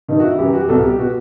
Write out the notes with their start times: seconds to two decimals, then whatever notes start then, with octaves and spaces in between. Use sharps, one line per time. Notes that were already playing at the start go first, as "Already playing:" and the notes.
0.08 G2 D#3 D#4
0.20 F#4
0.23 E4
0.39 F#2 E3 G4
0.53 F#4
0.61 G4
0.68 C2 B2 A4
0.84 G4
0.99 B2 F#4